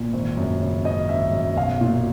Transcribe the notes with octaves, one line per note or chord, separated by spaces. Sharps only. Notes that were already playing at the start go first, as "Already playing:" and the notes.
Already playing: A#2
G#1
F#2
C#3
G#1 D#5
G#1 E5
F#2
B1 F5
A#2